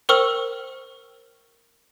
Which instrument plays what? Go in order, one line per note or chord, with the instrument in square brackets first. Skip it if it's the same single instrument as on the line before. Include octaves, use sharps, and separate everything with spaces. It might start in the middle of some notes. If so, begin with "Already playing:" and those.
[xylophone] A#4 C5 G5 C#6 E6 F6